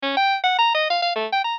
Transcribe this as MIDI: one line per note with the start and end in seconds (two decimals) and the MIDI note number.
0.03 0.16 61
0.17 0.36 79
0.44 0.55 78
0.59 0.71 82
0.75 0.89 75
0.90 1.01 77
1.02 1.11 77
1.16 1.27 57
1.32 1.44 79
1.44 1.56 82